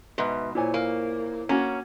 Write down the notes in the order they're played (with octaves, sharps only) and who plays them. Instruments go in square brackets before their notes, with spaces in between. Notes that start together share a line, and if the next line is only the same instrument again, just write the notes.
[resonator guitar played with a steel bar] G#2 B2 [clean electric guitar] B4 E5
[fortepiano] A#2 G#5 [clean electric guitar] E4 C5 C#5
[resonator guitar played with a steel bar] A#3
[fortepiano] A#3 F#4 [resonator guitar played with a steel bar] C#4